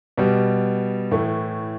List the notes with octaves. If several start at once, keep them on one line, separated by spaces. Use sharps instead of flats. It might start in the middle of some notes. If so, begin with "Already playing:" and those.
B2 G3
A2 E3 A3